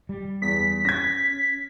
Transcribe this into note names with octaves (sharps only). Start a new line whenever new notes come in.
G3
E2 B6
C#4 G#6 A#6